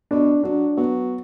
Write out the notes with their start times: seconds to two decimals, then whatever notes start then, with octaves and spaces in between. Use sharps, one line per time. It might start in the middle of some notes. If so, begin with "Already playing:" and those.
0.11 B2 D4
0.43 F#3 D4
0.77 F#3 B3